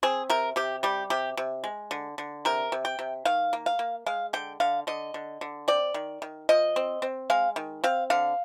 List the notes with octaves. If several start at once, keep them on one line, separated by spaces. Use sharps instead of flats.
C4 G#4
C3 A#4
C3 G4
G3 G4
C3 G4
C3
G#3
D3
D3
C3 A#4
C3
G5
C3
D#3 F5
A#3
F5
A#3
G#3 F5
D3 G5
D3 F5
D3 D#5
D3
D3
C4 D5
D#3
D#3
F3 D#5
C4
C4
G#3 F5
D#3
C4 F5
D3 F5